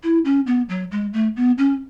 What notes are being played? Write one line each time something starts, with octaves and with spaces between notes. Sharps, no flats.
E4
C#4
B3
F#3
G#3
A3
B3
C#4